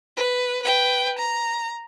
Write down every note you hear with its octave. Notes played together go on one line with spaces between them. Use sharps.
B4
B4 G5
A#5